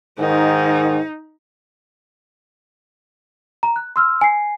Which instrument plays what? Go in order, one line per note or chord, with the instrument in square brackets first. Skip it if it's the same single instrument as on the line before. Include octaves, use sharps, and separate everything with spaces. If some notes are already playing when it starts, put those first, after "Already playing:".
[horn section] G#2 D#3 [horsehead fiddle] D#4
[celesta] A#5
F#6
C6 E6 F6
G#5 C7